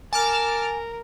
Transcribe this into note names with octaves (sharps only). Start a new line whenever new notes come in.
A#4 G#5 A5 D6 F6